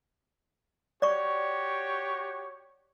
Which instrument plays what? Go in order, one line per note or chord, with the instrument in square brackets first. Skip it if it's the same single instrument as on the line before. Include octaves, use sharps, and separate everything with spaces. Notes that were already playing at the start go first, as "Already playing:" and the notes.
[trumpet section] F#4 G4 C#5 [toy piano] D5 C#6